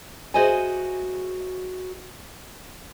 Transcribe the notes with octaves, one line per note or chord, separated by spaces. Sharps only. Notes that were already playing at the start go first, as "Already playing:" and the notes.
F#4 G#4 C5 D#5 E5 G#5